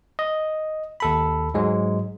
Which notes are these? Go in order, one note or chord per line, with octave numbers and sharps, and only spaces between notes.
D#5
D#2 A4 B5
G#2 F#3 G#3